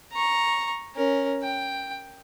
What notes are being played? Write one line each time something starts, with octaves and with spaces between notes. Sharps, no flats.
A#5 C#6
C#4 A#4
G5